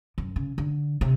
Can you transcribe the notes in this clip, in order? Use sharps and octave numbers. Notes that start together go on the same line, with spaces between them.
F#2
C#3
D3
C3